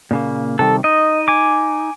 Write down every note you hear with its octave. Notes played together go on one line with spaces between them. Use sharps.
A#2 C#3 A#3
C3 D#3 G3 A4
D#4 D#5
G#5 D6